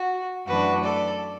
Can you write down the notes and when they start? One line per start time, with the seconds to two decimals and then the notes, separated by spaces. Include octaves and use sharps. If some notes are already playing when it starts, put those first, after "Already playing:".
Already playing: F#4
0.47 F#2 E3 A3 D4 F#4 B4
0.84 A4 D5